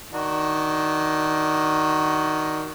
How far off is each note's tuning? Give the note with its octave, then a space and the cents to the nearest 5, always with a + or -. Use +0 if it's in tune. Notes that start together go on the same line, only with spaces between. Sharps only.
D#3 +0 D4 +0 F#4 +20